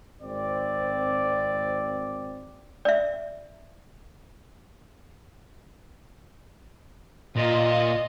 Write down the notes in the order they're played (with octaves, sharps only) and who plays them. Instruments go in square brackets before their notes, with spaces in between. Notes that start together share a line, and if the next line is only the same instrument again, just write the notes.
[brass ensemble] G#1 C4 D5
[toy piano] D5 E5
[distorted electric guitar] A#2 [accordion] F4 [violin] D#5